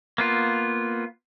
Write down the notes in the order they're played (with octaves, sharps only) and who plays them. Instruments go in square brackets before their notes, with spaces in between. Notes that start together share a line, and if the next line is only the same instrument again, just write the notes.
[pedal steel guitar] A#3 B3 F4